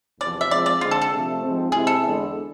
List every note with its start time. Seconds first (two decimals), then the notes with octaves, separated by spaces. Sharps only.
0.21 E2 C3 F3 D5
0.41 E5
0.51 F3 G#3 C4 F4 D5
0.66 D5
0.81 D3 G#3 C4 F4
0.91 A4
1.01 A4
1.11 C3 F3 A3
1.42 G#2 F3 G#3 C4
1.72 C3 G#3 C4 E4 G#4
1.87 A4
2.02 E2 D3 G#3 B3 D4